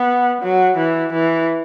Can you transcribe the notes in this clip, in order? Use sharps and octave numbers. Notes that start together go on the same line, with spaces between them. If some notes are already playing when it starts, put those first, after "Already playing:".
Already playing: B3
F#3
E3
E3